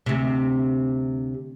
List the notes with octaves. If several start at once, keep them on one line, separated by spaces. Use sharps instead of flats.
D2 C3